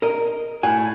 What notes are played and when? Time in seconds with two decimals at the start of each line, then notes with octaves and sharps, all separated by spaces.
0.02 A#4 D#5
0.63 A2 F#5 G#5